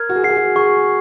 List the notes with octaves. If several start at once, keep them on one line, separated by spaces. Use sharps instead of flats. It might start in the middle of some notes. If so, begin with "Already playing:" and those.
Already playing: A#4 F6 G#6
F#4
G#4
F#4 C7
G#4
F#4
G#4 C#6